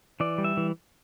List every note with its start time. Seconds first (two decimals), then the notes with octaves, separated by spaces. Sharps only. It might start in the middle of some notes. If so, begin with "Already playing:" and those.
0.20 E3 D5
0.38 G3
0.44 E5
0.57 E3